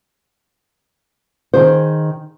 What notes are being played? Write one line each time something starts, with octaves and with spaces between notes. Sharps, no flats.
D#3 G#4 C5